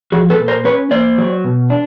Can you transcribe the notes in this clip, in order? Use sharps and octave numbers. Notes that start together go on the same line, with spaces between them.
F3 F#4 G#4
A4 B4
A#2
A#4 C5
C#4 B4 C#5
A#3 C5 D5
F#3
B2
D4